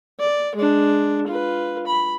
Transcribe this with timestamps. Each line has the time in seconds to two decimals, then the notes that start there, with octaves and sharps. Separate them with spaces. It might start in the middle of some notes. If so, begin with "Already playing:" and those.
0.19 D5
0.55 G#3 D4
1.27 F4 B4
1.87 B5